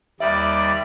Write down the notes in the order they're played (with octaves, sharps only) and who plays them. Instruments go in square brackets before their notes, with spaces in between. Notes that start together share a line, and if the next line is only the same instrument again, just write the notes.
[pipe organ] D#2 G3 D5 [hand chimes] E5